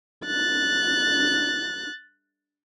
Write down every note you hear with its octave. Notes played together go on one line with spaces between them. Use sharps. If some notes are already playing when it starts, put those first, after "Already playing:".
F#6 A6